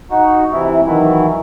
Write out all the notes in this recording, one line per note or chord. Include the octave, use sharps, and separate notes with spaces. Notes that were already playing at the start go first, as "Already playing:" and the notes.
D#4 F#4
C3 E3 E4
D#3 E3 F#3 E4